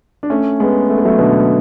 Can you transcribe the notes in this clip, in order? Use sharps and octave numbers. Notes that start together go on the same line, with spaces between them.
D4
A3 C#4
G#3 B3
A3
B3
F#3 A3
B2 D3